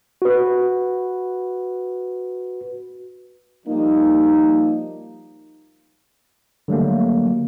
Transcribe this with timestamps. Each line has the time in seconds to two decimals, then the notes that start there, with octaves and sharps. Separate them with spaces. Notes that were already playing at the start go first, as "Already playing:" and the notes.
0.22 F#4 B4
3.67 F3 G3 A#3 D#4
6.68 D3 F#3 G3 A3 A#3